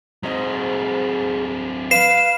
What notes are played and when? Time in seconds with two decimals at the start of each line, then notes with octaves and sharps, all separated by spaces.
0.23 G#2 F#3 C4 D#5
1.91 B4 F5 C7 E7